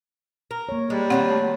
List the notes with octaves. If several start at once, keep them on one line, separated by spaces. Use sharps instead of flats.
A#4
A#3 C#5
G3 G#3
D#3 F#3 C4 F4 F#5
A3